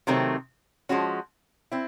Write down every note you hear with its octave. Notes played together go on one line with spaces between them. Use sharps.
C3 D#3 F#3 A3 C4
F3 G#3 C#4 F#4
C4 E4